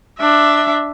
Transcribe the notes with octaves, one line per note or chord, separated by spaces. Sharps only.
D4 E5